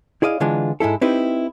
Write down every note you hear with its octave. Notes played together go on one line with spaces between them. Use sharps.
E4 G#4 D5 D#5 F5
D3 E3 G#3 D4 F4
G#2 G#3 E4 A4
C4 D#4 E4 G4 B4